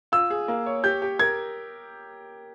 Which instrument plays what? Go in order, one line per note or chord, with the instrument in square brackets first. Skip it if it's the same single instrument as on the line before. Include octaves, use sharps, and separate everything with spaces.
[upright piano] F4 [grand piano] E6
[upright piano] G#4
A#3
C#5
[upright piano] G4 [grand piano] G6
[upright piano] G4
[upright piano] A#4 [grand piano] G#6